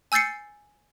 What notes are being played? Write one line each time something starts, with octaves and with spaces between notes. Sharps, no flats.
G#5 E6 G6 A6 C7 C#7